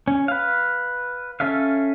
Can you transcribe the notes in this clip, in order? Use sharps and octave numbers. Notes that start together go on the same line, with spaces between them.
C#4
B4 F5
C#4 A4 E5 F5